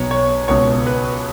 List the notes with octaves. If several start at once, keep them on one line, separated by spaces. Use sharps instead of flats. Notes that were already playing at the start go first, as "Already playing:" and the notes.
Already playing: B1 B2 C#5
C#5
C#2 B2 C#5
B4